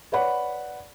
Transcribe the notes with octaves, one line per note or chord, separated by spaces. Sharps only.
B4 C#5 D5 F#5 B5